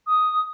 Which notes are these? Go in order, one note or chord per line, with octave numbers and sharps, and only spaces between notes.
D#6